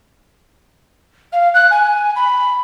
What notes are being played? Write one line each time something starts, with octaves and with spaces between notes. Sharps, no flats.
F5
F#6
G#5
B5